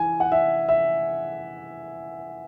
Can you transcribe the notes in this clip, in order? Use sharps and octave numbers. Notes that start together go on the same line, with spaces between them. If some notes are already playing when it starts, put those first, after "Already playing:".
Already playing: E3 G#5
F#5
E5
E5